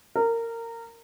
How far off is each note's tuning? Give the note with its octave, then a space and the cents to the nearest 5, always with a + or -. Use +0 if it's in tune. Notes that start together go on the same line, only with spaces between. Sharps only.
A#4 -20